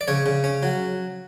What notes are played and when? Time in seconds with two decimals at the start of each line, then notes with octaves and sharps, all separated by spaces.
0.01 D5
0.08 C#3 C#5
0.26 C#3
0.44 C#4
0.63 F#3